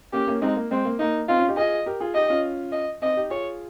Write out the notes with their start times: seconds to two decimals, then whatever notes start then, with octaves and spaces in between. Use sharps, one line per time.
0.13 A#3 C#4 G4
0.27 A#3 C#4
0.41 G#3 C4 D#4
0.56 A#3
0.71 G#3 C4
0.85 A#3
0.99 A#3 D#4
1.28 C4 D#4 F4
1.38 C#4 F4
1.48 D#4 G4
1.57 F4 G#4 D#5
1.86 G4 A#4
2.00 F4 G#4
2.15 D#4 G4 D#5
2.30 C#4 F4
2.72 D#5
3.02 C4 D#4 D#5
3.17 D#4 G4
3.30 F4 G#4 C#5